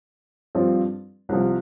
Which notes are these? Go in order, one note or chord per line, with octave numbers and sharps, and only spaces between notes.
G2 F3 C4 F4
C2 C3 F3